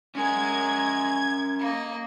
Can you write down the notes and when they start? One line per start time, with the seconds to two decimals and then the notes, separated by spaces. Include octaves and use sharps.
0.15 G#3 C#4 A#4 G#6
1.59 A#3 D#5